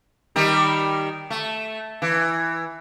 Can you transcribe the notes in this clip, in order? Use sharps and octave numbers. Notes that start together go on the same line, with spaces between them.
D#3 G3 D#4
A3
E3